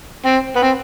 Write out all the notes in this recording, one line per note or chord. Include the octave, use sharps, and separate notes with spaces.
C4
B3
C4